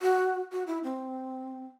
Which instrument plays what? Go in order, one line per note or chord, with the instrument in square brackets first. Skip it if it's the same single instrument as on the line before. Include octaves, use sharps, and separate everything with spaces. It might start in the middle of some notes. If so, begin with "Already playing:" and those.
[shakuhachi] F#4
F#4
E4
C4